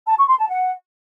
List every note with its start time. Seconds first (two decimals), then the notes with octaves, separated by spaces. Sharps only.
0.07 A5
0.17 C#6
0.28 C6
0.38 A5
0.49 F#5